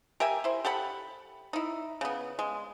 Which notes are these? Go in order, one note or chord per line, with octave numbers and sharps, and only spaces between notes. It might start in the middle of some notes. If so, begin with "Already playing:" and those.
G4 A#4 E5 G#5
E4 C5
G4 A4 F#5 B5
D#4 E4
C#3 B3
G#3